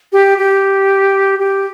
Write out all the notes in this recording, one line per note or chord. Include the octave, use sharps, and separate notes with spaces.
G4
G4
G4